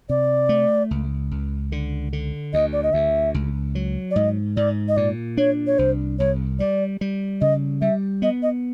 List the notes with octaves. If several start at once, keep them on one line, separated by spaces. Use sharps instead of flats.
C3 D5
A3
C#2
C#2
D3
D3
D2 D#5
D5
D#5
D2 E5
C#2
F#3
D5
G#2 D#5
G#2 D5
D#5
A#2 D5
D4 C#5
C#5
C2 C5
C2 C#5
G3 D5
G3
C#3 D#5
G3 E5
B3 D#5
D#5